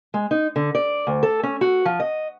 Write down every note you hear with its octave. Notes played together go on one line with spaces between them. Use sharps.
G#3
D#4
D3
D5
D2
A4
C#4
F#4
F3
D#5